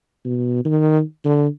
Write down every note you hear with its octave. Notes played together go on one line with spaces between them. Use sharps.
B2
D#3
D3